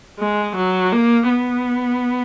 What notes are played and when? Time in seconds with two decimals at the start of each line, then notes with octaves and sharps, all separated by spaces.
0.19 G#3
0.56 F#3
0.92 A#3
1.29 B3